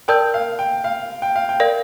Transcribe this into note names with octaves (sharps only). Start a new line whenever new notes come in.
A#4 D5 G5 A5 E6 G6
F5
G5
F5
G5
F5
G5
A#4 D5 F5